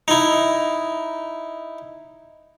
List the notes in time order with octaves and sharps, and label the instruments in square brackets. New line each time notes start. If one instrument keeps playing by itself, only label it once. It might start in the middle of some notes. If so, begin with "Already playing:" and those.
[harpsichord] D#4 E4